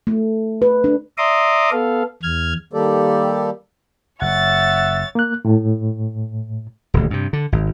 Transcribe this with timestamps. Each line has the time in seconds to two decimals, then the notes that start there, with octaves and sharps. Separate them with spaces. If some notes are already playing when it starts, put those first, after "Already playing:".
0.07 A3
0.62 B4
0.84 D4
1.18 D5 E5 A#5 C6 D6 D#6
1.72 B3 A4 F5
2.23 E2 F6 G#6
2.73 D#3 G3 A#3 G4 A4 D5
4.21 F#1 C#5 E5 F#5 A6
5.15 A#3 F#6
5.45 A2
6.94 D#1 D2
7.10 G2 C3
7.33 D3
7.52 G#1